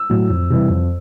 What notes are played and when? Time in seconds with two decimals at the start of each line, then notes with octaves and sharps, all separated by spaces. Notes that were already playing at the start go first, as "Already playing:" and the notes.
Already playing: E6
0.10 A2 F#3
0.30 F2
0.50 C3 E3 G3
0.69 F2